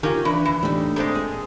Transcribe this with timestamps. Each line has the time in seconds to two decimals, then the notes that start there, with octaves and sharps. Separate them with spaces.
0.03 D#3 C#4 F4 G4 A#4
0.25 E3 D4 B4
0.45 D#2 E3
0.62 A2 G3 A3 D4 D#4
0.96 A#2 G#3 C4 A4 D6
1.15 G#4